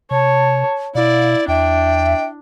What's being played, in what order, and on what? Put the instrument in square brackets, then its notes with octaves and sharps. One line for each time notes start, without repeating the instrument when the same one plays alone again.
[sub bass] C3 [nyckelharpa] C#5 [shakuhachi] A5
[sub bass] B2 [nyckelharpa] E4 [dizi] D5 [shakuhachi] F5
[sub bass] E2 [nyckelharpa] D4 [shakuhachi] E5 [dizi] G5